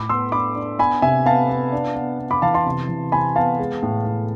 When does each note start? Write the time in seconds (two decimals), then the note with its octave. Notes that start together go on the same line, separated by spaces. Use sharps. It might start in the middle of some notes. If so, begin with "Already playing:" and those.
Already playing: A2 B5 D6
0.09 B3 C6 E6
0.32 D4 B5 D6
0.56 D4
0.79 B3 G#5 B5
1.02 C3 E5 G#5
1.25 B3 F5 A5
1.49 B3
1.72 D4
1.95 B3
2.20 B3
2.31 B5 D6
2.42 E3 F5 A5
2.54 A5 C6
2.66 C3
2.89 E3
3.12 C3 G#5 B5
3.35 B3 F5 A5
3.59 G#3
3.83 A2
4.05 A2